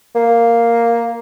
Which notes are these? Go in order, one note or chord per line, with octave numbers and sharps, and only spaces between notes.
A#3